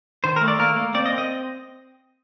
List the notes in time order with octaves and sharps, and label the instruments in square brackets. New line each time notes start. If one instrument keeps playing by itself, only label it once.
[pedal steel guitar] D#3 C5
A#4
A3
D5
A#3 A#4
A#3
C4 D5
D#5
C4
D#5